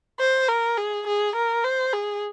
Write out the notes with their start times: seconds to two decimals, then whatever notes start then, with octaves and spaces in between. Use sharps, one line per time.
0.20 C5
0.48 A#4
0.78 G#4
1.07 G#4
1.36 A#4
1.64 C5
1.93 G#4